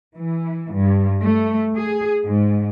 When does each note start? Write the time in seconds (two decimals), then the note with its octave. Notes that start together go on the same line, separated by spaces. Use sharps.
0.16 E3
0.73 G2
1.21 A3
1.75 G#4
2.25 G#2